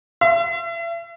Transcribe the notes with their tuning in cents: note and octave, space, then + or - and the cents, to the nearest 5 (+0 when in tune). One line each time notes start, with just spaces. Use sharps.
E5 +40